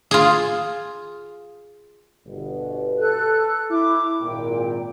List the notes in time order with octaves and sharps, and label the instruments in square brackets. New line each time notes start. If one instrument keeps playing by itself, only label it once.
[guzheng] F4 G#4
[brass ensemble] G1 B2
[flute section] A4 F#6
[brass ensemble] E4 [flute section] D6
[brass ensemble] G#1 A#2 [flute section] G5